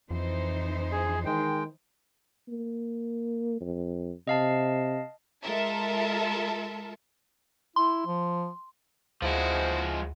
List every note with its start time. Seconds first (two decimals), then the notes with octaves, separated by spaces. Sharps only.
0.11 F2 E3 D#4 C5
0.92 G#4
1.25 D#3 G#3 G5
2.49 A#3
3.61 F2
4.27 C3 D#5 F5 A5
5.42 G#3 F4 A4 A#4 E5 A5
7.76 E4 C6
8.06 F3
9.22 D2 F3 G#3 E4 F#4 G#4 C5